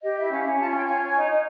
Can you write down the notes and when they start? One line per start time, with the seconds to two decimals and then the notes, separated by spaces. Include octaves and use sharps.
0.02 G4 D#5
0.16 E4 E5
0.30 C#4 F5
0.44 C#4
0.58 F4 A5
0.68 G#5
0.73 C#5 G5
0.84 F4 G#5
1.02 C#5
1.16 D#4
1.29 D#4